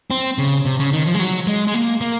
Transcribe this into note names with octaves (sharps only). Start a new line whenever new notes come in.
C4
C#3
C3
C#3
D#3
F3
G#3
F#3
G#3
G#3
A#3
A#3